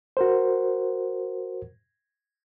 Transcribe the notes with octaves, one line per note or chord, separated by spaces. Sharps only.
F#4 A#4 C5